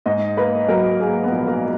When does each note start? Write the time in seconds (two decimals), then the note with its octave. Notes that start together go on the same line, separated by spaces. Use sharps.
0.06 G#2 D#5
0.37 A#3 B4
0.68 F#3 A#4
1.00 A#3 G#4
1.24 B3
1.32 A#1
1.48 A#3